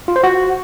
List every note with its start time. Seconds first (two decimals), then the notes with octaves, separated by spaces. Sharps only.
0.08 F4
0.16 C5
0.24 F#4